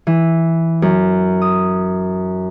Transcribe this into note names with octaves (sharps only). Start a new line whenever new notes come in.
E3
F#2
D#6